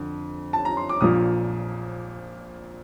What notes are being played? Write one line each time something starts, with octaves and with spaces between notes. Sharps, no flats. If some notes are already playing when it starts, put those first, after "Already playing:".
Already playing: F2 D3
A5
A#5
C6
D6
A#1 A#2 F3 A#3 D#6